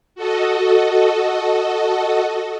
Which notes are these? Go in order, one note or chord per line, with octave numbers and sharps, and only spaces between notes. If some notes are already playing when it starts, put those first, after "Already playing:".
F#4 A4 D#5